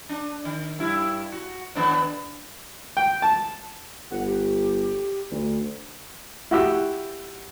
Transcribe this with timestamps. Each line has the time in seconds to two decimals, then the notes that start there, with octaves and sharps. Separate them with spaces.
0.09 D4
0.45 D#3
0.79 G2 E4
1.32 F#4
1.75 D#2 B3 D4
2.97 G5
3.22 A5
4.11 G1 F#5
4.26 G4
5.31 D2
6.51 E4 F#4 G4 E6